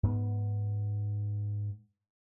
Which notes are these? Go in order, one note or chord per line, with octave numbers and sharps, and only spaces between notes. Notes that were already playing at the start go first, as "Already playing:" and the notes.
G#2 B3